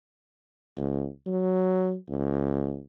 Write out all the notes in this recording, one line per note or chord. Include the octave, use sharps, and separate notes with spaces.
C#2
F#3
C#2